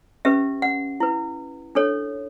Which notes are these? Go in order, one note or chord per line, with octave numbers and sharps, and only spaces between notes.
C#4 G4 B4 E5
F#5
E4 B4
D4 A4 C#5